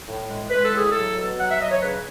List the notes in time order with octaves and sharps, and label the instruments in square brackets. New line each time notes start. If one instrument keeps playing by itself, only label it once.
[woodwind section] A2
G#3
G#3 B4
A4
A2 G#4
F#3 A4
B2
F#3 F#5
E5
F#3 D#5
C#5
C#3 B4